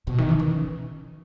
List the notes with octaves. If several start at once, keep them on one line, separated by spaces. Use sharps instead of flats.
B2
D#3
E3
D#3
C#3